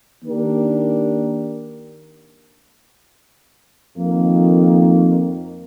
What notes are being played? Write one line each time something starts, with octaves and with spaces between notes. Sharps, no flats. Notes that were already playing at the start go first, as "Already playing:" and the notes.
D#3 A#3 D4 G4 A#4
F2 D#3 A#3